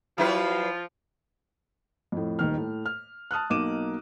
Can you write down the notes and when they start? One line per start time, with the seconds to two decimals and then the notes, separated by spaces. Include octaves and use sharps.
0.18 F3 F#3 E4 F4 B4
2.12 F2 A2
2.39 D#1 D#3 F6
2.57 A2
2.86 F6
3.31 A5 D#6 F6 F#6
3.50 B1 A#3 D#4 D6 D#7 E7